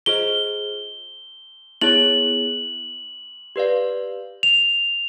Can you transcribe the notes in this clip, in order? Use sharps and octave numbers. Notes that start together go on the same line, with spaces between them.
F4 G#4 C5 D#5 G7
B3 E4 G#4 C#5 F#7
G4 B4 D5 F5
F7